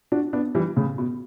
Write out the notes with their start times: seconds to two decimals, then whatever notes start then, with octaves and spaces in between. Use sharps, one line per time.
0.12 D4 F#4
0.33 B3 D4
0.55 E3 G3
0.77 A2 C#3
0.98 B2